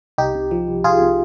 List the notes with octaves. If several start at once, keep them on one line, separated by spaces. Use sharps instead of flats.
C2 D#4 G4
C3
F3
C2
C2 F4 G#4
C3